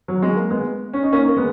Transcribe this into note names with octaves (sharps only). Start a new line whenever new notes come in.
F#3
G#3
A#3
G#3 B3
C#4
D#4
A#3 C#4
A#3
G#3 B3